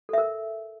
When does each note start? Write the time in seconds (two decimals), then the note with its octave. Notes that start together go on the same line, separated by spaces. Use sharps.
0.09 A4
0.13 E5
0.18 A#4